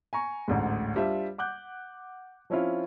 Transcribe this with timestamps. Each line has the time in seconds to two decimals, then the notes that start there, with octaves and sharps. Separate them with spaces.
0.13 G#5 A#5 C#6
0.48 A1 D2 G#2
0.96 G3 D4 F4 C5 E5
1.38 F#5 D6 F#6 G6
2.50 F3 C4 C#4 E4 F4